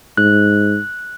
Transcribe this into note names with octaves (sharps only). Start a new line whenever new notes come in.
G#2 F#6